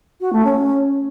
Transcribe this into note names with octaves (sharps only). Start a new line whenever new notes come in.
F#4
A3
C#4